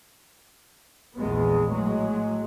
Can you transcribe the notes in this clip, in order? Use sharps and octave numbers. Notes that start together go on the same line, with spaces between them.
A#1 E2 G#3 B3
A2 F#3 G#3